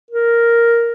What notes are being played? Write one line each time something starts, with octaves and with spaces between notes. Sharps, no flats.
A#4